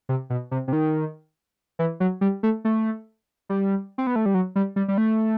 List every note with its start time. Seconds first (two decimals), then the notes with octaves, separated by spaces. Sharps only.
0.09 C3
0.30 B2
0.51 C3
0.68 C3
0.73 D#3
1.79 E3
2.00 F#3
2.21 G3
2.43 A3
2.65 A3
3.49 G3
3.98 C4
4.07 B3
4.16 A3
4.26 G3
4.34 F#3
4.56 G3
4.76 G3
4.88 G3
4.98 A3